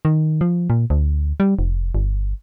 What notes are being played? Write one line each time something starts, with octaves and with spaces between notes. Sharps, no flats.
D#3
F3
A#2
D2
G3
F1
G1